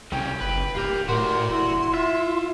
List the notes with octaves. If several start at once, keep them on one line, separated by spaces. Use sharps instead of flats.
C2 A#2 C#4 G5
F#1 B4
D1 F4 G4 A#4
A2 F#4 A#4 D5 C6
E1 E4
F4 E5